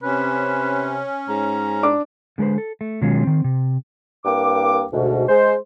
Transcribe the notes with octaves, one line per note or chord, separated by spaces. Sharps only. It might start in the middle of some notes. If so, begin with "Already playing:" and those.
C3 C#4 B4
G#2 A#5
D4 D6
D3 G#3 A4 B4 C5
A4
A3
B2 D#3 F#3 G#3 C#4 F4
D#3 C4
C3
C2 G2 A#3 G5 D6
D2 G#2 B2
G#3 C5